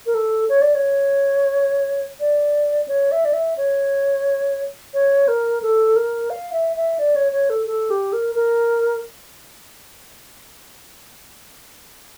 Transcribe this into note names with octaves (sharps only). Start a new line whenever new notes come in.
A#4
A4
C#5
D5
C#5
D5
C#5
E5
D5
E5
C#5
C#5
A#4
A4
A#4
F5
E5
E5
D5
C#5
C#5
A4
A4
G4
A#4
A#4